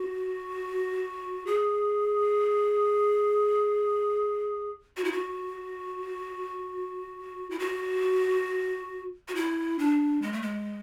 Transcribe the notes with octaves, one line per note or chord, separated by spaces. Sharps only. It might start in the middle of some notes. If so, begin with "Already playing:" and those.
Already playing: F#4
G#4
F#4
E4
F#4
E4
F#4
F#4
E4
D4
G#3
A3
G#3